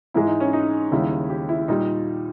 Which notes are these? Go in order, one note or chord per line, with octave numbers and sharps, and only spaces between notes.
G#2 E3 G#3 E4
D#4
C#4
D#4
D#2 C#3 G3 E4
G4
E4
A#2 G3 D#4